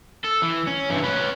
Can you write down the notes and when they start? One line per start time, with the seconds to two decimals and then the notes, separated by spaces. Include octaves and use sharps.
0.24 A4
0.42 E3
0.67 C#4
0.91 G2 E3
1.04 C#4 B4